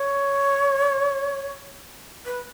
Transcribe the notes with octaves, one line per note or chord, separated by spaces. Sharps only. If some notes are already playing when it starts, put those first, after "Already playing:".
Already playing: C#5
B4